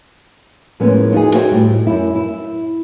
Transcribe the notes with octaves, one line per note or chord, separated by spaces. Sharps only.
A2 F3 G#3 A#3 B3 C#4
D#4 F4 F#4 G#4
F#4 C5 C#5 E5 G5
A2 G3
F#2 E4
E4